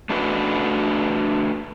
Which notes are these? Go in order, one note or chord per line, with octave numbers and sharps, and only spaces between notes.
A3 D4 F#4 B4